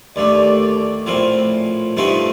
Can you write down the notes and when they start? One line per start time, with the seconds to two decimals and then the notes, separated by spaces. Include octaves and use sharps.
0.16 D#2 D3 A3 D5
1.06 A#1 A2 F3 C4
1.97 G2 F3 A3 C4 D#4